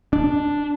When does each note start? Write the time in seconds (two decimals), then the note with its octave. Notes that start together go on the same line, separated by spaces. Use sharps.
0.13 D4